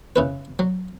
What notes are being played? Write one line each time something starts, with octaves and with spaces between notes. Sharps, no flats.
C#3 E4 B4
F#3